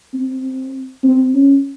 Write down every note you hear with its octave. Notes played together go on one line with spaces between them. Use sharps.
C4
C4
C#4